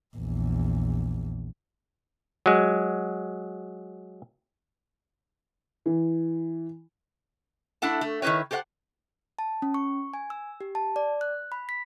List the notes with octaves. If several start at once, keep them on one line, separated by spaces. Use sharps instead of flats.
A#1 E2
F#3 G#3
E3
A3 D4 E4 F#5 A5
A3
D#3 E4 G4 B4 C#5
G4 A4 C5 C#5 F#5
A5
C#4
C#6
G#5
E6
G4
A5
D5
F#6
B5
B6